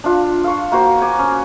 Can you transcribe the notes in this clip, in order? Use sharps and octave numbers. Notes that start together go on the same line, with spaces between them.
D4 F4
F5 C#6
A#3 F#4 C5
G#5 D6
C#4